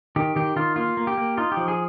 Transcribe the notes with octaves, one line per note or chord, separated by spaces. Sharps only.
D#3 G4
D#3 G4
D#3 F4
A#3 F4
A#3
G4
A#3
D#4 F4
G4
F3
G#4